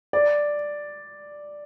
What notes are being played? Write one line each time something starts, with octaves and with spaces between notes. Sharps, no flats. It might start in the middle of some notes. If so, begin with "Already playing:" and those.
D5